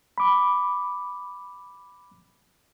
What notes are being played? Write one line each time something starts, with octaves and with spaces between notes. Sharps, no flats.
B5 D6